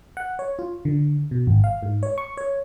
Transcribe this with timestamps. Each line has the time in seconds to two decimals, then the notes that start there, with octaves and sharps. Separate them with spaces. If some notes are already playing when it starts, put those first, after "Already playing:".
0.17 F#5
0.39 C#5
0.59 F4
0.85 D3
1.31 B2
1.47 G#1
1.64 F5
1.83 G#2
2.03 C#5
2.18 C#6
2.37 C#5